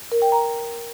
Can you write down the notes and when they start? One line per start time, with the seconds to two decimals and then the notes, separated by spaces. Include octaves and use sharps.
0.12 A#4
0.22 G5
0.32 A#5